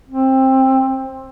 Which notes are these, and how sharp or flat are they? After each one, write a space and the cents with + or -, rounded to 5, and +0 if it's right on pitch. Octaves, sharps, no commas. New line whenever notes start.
C4 +20